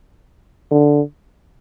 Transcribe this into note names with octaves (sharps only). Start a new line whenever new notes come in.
D3